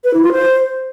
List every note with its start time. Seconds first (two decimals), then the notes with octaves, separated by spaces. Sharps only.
0.04 B4
0.14 E4
0.23 F4
0.32 C5